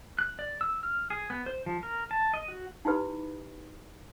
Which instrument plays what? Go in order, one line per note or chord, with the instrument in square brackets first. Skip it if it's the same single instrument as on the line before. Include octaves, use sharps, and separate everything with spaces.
[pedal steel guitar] F#6
D5
E6
F6
G#4
B3
C5
F3
A#4
A5
D#5
F#4
[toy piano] D#4 E4 G4 B4 B5